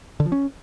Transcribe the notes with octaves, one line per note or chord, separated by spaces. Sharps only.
D3
F3
C#4